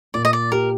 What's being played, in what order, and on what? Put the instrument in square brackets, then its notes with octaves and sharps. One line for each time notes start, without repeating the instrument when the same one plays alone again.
[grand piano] A#2 [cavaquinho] D5
[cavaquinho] D#5
D5
[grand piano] G4 [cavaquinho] A#4